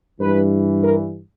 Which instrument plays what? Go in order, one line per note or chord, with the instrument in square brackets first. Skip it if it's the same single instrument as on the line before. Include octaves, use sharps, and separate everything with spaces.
[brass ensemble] G2 E3 B4
A#4